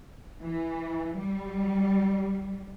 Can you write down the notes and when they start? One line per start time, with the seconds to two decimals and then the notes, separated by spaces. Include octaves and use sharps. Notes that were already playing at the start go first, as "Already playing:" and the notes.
0.42 E3
1.17 G3